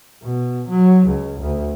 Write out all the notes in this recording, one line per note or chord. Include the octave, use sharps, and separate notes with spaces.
B2
F#3
C#2
D2